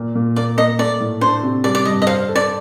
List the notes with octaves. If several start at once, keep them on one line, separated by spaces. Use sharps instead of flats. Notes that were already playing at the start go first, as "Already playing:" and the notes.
Already playing: A#2 A#3
A#2
A#3 D5
A#3 D#5
A3 D5
A2
D4 C5
C3
G3 D5
D5
G2 D#5
D#5
C5 F5
A4
D5